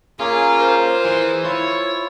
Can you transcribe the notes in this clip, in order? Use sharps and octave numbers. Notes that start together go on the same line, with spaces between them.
A#3 C#4 F4 G#4
A#4 C5
E3 G#4
E4 F4 C#5